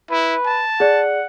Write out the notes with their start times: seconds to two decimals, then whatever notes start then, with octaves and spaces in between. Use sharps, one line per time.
0.11 E4 B4
0.45 A5
0.80 G#4 D5 F#5